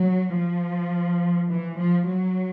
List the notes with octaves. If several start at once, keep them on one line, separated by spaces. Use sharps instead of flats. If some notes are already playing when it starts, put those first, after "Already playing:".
Already playing: F#3
F3
E3
F3
F#3